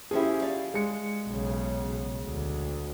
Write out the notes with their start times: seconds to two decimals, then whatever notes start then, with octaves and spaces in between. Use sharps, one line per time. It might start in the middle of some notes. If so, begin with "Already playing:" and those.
0.11 F3 C#4 E4 G4 G#4
0.42 D5 F5
0.74 G#3 C#7
1.27 B1 C#3
2.21 D2